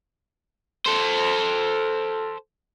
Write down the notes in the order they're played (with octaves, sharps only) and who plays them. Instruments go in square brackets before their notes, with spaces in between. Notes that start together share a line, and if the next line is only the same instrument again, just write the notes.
[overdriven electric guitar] A4 C5